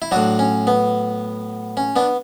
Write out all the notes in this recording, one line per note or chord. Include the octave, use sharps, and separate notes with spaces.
E4
A2 F#3 D4 F#4
C#4
B3
C#4
B3 D4